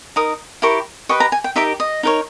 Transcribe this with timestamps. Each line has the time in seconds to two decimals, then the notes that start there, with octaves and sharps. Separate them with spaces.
0.16 D#4 A#4 D#6
0.62 E4 G4 A#4 C#6
1.09 G4 B4 D#5 C#6
1.20 A#5
1.32 G#5
1.44 G5
1.56 D#4 G4 A#4 E5
1.80 D#5
2.03 D#4 A#4 C#5